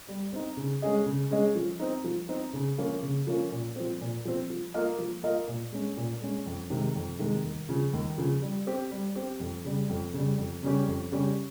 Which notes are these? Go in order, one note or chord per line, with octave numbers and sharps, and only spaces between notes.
G3
C4 D#4
C#3
G#3 C#4 G#4 D#5
C#3
G#3 C#4 G#4 D#5
F3
C4 D#4
F3
C4 D#4
C#3
F3 A#3 C#4 F4
C#3
F3 A#3 C#4 F4
A#2
F3 C4
A#2
F3 C4
F3
A#3 F4 A#4 D#5
F3
A#3 F4 A#4 D#5
A#2
G#3 C#4
A#2
G#3 C#4
F2
C3 D#3 G#3
F2
C3 D#3 G#3
D#2
C#3 F3
D#2
C#3 F3
G3
C4 G4
G3
C4 G4
F2
C#3 G3
F2
C#3 G3
F2
C#3 G3 C#4 G4
F2
C#3 G3 C#4 G4